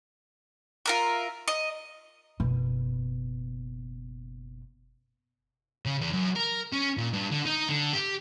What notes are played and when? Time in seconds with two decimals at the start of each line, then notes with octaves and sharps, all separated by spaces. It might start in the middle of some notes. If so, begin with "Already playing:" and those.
0.86 F4 A#4 E5
1.48 D#5
2.40 F#1 B2
5.85 C#3
6.01 E2
6.13 F#2
6.36 A#4
6.73 C#4
6.97 A#2
7.13 G2
7.31 D3
7.46 D#4
7.69 D3
7.94 G4